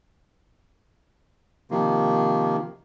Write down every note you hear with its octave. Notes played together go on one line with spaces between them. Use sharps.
C3 D#3 F3 A#3